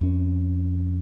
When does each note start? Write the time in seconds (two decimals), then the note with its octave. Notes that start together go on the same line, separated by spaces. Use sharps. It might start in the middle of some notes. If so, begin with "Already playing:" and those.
0.01 F2 C#4